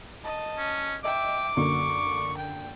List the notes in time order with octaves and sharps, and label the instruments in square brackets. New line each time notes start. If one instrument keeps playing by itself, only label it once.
[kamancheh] D#5 A5
[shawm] C#4
[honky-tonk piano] D#5 [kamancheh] E5 G5 [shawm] D6
[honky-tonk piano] F#2 D3 A#3 [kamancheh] C#6
[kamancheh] G5